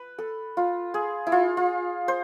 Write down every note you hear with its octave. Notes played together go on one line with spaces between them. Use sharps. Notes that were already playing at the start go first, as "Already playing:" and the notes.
Already playing: B4
A4
F4
G#4
E4
F4
F4
C5